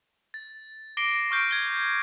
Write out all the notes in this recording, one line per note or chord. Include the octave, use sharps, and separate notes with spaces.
A6
D6 A#6 C7 D7 G7
C#6 F6 G6 C7 D7
G#6 G7